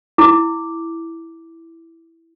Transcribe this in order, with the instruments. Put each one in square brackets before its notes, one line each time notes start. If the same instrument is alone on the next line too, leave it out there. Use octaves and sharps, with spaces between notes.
[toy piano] E4 D6